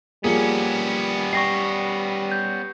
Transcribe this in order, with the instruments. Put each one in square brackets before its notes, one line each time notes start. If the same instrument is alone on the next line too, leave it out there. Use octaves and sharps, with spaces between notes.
[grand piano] F3 A#3 G#4 [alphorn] G3 [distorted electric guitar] B3 C#4
[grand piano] D5 G5 [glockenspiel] C#6 A#6 C7
[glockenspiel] G6